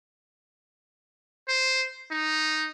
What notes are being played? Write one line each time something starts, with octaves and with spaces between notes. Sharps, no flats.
C5
D#4